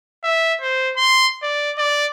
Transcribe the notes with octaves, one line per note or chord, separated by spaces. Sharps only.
E5
C5
C6
D5
D5